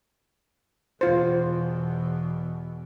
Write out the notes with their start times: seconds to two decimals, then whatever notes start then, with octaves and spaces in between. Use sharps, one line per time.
1.01 E2 B2 F4 C5